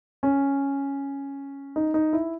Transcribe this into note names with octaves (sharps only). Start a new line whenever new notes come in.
C#4
D#4
D#4
E4